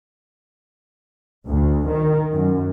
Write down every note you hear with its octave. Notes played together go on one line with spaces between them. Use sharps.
D2
D#3
F#2